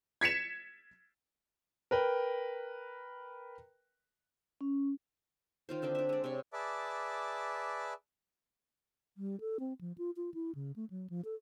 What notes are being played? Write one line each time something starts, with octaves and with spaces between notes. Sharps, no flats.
G#6 B6 C#7 E7
A#4 B4 G5
C#4
D#3 F4 C5
D3 C4 D4 D#4
D4 E5
G#3 D5
C3 C#5
G#4 B4 D5 E5 A5 D6
G3
A4
C4
F3
F4
F4
E4
C#3
A3
F#3
F3
A4